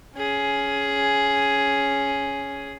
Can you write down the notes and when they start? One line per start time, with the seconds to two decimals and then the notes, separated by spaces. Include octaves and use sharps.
0.16 C#4 G#4